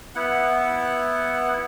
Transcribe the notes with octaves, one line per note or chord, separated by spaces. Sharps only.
B3 E4 F#5